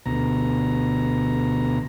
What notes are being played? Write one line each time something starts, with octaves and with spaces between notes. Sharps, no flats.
D2 B2 A#5